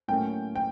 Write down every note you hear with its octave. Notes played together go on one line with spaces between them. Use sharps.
A2 F#3 A#3 C#4 G5
G5